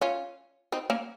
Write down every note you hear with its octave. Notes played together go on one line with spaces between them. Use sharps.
C#4 F4
C4 D#4
A#3 C#4